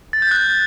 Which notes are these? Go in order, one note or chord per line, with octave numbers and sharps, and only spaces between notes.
A6
G6
F#6